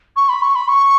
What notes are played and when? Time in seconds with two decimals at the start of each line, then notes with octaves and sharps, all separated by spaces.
0.16 C#6
0.29 B5
0.42 C#6
0.55 B5
0.68 C#6